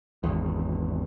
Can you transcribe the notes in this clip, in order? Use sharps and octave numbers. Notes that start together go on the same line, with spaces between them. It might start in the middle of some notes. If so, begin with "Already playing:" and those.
G#1 E2